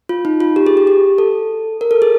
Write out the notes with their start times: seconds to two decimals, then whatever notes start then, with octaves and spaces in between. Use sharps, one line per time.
0.09 F4
0.25 D#4
0.40 F4
0.56 G4
0.67 G#4
0.77 G4
0.87 G4
1.18 A4
1.81 A#4
1.91 A4
2.02 G#4